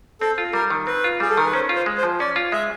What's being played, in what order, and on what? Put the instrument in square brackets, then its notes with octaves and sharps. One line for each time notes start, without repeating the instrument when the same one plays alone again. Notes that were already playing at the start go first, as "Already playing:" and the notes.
[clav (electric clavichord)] C4 [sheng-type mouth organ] A4
[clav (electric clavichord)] F4
[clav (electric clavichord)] G3 [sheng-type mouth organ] A#4
[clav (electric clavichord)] D#3
[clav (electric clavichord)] C4 [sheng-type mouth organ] B4
[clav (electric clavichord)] F4
[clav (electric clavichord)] G3 [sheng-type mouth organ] G#4
[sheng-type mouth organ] A4
[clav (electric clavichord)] D#3 [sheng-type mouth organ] A#4
[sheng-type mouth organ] B4
[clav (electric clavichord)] C#4 [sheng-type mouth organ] C5
[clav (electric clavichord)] F4
[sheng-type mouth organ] C5
[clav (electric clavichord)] G#3
[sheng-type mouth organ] C5
[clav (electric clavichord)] F3
[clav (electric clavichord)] C#4 [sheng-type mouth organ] D5
[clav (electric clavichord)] F4
[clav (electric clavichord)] G#3 [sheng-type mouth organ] E5